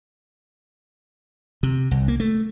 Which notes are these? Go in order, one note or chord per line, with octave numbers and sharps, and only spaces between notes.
C3
C2
A#3
A3